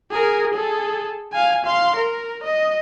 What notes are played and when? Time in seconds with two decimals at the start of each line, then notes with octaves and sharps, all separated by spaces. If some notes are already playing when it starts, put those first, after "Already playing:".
0.11 G#4 A#4
0.54 G#4 A4
1.32 F5 G#5
1.65 F5 C6
1.96 A#4
2.44 D#5